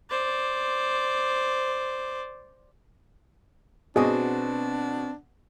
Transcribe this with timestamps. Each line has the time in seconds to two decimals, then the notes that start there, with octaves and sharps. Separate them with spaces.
0.10 C5 D5
3.96 B2 B3 C4 D4 F#4 G#4 D5 D#5